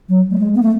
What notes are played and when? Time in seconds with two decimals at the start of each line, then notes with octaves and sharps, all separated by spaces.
0.09 F#3
0.31 A3
0.39 G#3
0.55 B3
0.62 A3